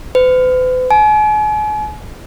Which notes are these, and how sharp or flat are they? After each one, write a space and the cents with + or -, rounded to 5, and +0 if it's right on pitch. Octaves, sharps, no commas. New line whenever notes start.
B4 +45
G#5 +40